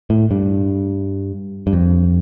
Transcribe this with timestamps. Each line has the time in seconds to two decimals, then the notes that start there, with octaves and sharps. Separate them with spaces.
0.10 A2
0.31 G2
1.67 G2
1.73 F2